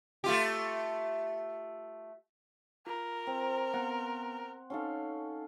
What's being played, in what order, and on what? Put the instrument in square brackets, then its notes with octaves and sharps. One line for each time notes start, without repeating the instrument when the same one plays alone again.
[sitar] A3 F4 G4
[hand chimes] F4 [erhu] A#4
[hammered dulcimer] C4
[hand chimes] B3 [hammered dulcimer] F#5
[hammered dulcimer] C#4 A4 F5 [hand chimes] D#4 F#5